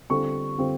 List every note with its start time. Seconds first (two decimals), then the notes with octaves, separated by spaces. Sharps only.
0.10 D3 G3 C4 F4 C#6
0.58 D3 G3 C4 F4